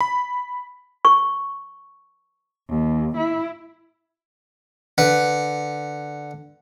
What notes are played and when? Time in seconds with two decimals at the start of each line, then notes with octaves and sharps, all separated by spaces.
0.01 B5
1.05 C#6
2.69 D#2
3.17 E4
4.98 D3 B4